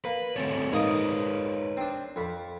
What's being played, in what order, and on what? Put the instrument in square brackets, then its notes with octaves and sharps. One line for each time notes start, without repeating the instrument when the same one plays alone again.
[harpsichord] A#3 [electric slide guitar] B4
[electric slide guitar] A3 C4 C#5 [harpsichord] A5
[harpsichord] G#2 A#3 D#5 [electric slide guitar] A#4 B4 C#5
[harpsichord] C4 D4
F2 B5